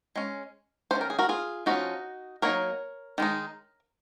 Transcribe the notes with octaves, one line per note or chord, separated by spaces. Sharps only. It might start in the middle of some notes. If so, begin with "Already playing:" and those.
G#3 C#4
D#3 A#3 C#4 C5
A#4
G#4
F#4 A#4
F4 G#4
F3 A#3 C#4 D#4 F#4
F#3 A#3 D#4 A#4 C#5
D#3 G#3 D#4